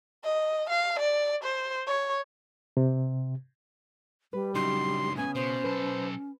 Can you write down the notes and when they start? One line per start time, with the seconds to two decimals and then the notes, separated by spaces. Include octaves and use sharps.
0.24 D#5
0.70 F5
0.99 D5
1.43 C5
1.87 C#5
2.77 C3
4.33 G3 B4
4.55 C#2 F#2 D4 D#4 F#4 C6
5.17 C#3 B3 C#4 G#5
5.35 B2 C5
5.64 B1 A4 B4